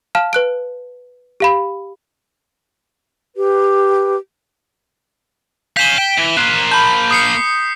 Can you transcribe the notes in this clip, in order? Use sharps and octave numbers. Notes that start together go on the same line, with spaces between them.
F5 A5 F6 E7
B4 F#6 D7
G4 F5 B5
G4 B4
F5 G#5 G6 B6 E7 G7
G5
E3
A#3 C5 F#6
A5 B5 G6
D#6 C7 C#7